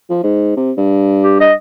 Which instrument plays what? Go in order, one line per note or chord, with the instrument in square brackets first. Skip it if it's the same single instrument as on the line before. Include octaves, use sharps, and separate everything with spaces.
[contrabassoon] F3
G#2
C3
G2
[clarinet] G4
D#5